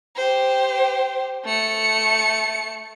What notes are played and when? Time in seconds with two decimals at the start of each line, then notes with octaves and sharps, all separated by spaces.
0.16 G4 C5
1.45 A3 C#7